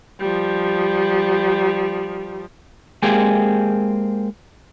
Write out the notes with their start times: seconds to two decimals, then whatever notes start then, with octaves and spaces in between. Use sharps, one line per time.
0.20 F3 G3
3.02 G#3 A#3 C4 G4 G#4